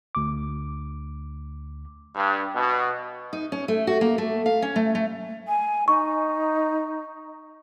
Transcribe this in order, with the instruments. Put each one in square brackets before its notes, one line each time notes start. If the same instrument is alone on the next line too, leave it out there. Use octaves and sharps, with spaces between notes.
[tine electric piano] D2 D6
[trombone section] G2
B2
[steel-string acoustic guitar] D#4
C#4
A3
F#4
A#3
A3
F5
C#4
A3
A3
[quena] G#5
[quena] D#4 [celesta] C#6